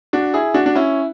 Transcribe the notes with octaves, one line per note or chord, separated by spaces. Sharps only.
D4 F#4
E4 G#4
D4 F#4
D4
C#4 E4